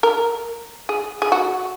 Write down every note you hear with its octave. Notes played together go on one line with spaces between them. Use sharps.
A#4
G#4
G#4
F#4